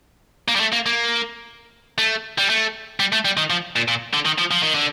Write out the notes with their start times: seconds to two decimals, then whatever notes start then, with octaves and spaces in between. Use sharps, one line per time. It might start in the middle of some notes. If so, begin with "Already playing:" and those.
0.48 A#3
0.55 G3
0.60 A3
0.72 A#3
0.86 A#3
1.98 A3
2.38 G3
2.50 A3
3.00 G3
3.13 A3
3.25 G3
3.37 D#3
3.50 F3
3.76 A#2
3.88 A#2
4.14 D3
4.26 D#3
4.38 F3
4.51 F3
4.63 D#3
4.74 D3